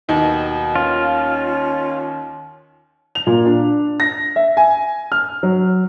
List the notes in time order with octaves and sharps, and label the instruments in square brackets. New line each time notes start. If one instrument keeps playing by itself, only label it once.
[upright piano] D#2 D#4 [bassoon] B2
[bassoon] C#4 [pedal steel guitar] F4
[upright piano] F7
A#2
D4
A#6
E5
G#5
F6
F#3